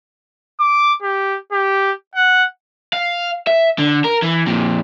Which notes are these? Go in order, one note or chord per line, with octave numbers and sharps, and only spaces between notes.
D6
G4
G4
F#5
F5
E5
D3
A#4
E3
F2 A#2